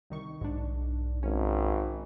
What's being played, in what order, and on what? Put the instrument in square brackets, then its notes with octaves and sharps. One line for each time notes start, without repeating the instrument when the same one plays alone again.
[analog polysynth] C2 D#3 C#6
[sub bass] B1 [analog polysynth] G#2 D4
[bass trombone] G#1 [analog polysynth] C#4